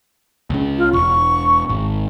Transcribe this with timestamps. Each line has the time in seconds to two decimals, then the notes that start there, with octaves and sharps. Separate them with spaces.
0.50 C#2 C#3
0.78 F4
0.93 E1 C#6
1.70 G#1